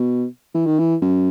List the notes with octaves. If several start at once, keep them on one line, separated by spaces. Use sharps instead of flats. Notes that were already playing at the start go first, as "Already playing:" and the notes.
Already playing: B2
E3
D#3
E3
F#2